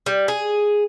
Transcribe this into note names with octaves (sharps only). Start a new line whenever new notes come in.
G3
G#4